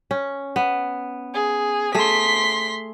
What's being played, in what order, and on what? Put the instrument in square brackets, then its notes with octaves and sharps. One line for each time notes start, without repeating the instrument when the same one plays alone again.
[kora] C#4
B3
[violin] G#4
[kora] A3 G#4 [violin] C6 B6